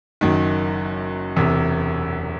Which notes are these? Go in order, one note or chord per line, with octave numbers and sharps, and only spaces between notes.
F#1 F#2 D#3
E1 E2 C3